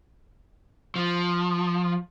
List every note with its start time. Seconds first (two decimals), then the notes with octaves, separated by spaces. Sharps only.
0.96 F3